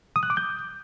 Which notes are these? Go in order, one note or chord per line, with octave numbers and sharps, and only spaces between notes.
D#6
F#6
D6
G6